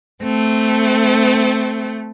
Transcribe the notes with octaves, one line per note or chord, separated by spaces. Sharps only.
A3 C4